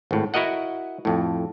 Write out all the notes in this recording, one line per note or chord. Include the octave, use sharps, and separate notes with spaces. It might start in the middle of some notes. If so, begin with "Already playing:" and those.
G#1 A2
E4 F#4 A#4 D#5 F#5
F2 A2